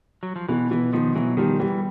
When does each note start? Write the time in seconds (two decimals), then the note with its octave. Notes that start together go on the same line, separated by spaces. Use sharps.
0.23 F#3
0.36 F3
0.49 B2 E3
0.71 B2 E3
0.93 B2 D#3 F3
1.15 B2 E3 F#3
1.37 D#3 F3 G3
1.59 E3 G3